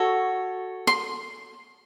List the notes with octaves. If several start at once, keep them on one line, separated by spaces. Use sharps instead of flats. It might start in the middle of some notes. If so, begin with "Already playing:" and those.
Already playing: F#4 A4 C#5
C6